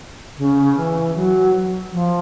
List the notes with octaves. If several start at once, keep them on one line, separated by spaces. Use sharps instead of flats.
C#3
E3
F#3
F3